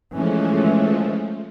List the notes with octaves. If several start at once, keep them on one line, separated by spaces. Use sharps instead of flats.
E3 F3 G#3 A3 C#4